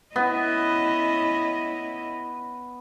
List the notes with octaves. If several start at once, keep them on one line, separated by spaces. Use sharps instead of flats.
B3 C#4 E4 D#5